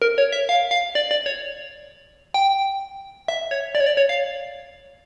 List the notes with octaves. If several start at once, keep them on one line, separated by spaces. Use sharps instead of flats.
A#4
C#5
E5
F5
F5
D5
D5
C#5
G5
E5
C#5
D5
C#5
D5
C#5
F5